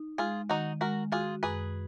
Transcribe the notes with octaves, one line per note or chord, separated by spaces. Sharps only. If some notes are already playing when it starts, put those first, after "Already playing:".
Already playing: D#4
G#3 F4 G#4
D#3 D#4 F#4
G#3 F#4 A#4
F4 F#4 G#4
F#2 G#4 B4